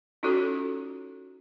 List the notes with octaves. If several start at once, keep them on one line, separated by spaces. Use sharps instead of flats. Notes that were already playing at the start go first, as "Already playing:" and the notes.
C#4 D#4 F4 F#4 A4 C#5